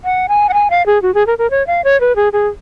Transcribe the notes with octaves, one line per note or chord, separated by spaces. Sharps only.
F#5
G#5
F#5
G#5
F5
G#4
F#4
G#4
A#4
A#4
C#5
F5
C#5
B4
G#4
G#4